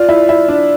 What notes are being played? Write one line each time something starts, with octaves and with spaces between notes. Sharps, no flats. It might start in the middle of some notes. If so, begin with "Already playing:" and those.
Already playing: F4 D5
E4
E4
D4